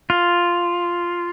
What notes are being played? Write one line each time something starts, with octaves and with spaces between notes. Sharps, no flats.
F4